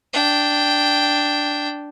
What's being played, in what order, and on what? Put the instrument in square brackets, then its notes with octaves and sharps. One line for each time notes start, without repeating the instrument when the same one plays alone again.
[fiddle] D4 G5